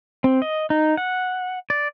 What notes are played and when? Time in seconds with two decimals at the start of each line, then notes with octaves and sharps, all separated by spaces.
0.24 C4
0.42 D#5
0.70 D#4
0.97 F#5
1.70 D5